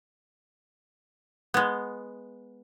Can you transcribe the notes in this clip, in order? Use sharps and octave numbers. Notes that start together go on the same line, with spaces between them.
G#3 B3